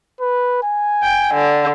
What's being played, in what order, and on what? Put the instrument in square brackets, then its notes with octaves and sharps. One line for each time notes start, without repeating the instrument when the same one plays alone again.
[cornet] B4
G#5
[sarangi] G5
D3